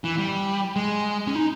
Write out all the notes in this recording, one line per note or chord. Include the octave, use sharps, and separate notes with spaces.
E3
G3
G#3
C#4
D#4